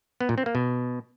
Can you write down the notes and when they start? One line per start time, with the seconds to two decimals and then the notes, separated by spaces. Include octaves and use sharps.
0.21 B3
0.29 A#2
0.38 C4
0.46 A#3
0.55 B2